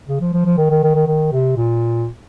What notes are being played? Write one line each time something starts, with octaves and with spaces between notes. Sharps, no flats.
C#3
F3
F3
F3
D#3
D#3
D#3
D#3
D#3
C3
A#2